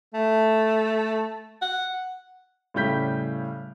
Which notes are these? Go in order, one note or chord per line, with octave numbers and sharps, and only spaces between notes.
A3
F#5
A2 C#3 G3 G6 B6